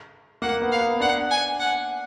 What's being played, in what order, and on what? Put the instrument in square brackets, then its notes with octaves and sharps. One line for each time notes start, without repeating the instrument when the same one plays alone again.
[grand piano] A#3 [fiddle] F#5
[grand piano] B3
[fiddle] F5
[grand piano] B3
[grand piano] D4 [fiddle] F#5
[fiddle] G#5
F#5